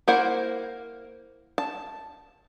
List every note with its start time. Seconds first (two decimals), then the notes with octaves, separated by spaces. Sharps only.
0.08 A#3 E4 A#4 C5 F#5
1.58 A5